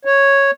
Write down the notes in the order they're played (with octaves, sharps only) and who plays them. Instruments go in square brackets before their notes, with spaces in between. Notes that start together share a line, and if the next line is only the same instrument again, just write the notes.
[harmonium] C#5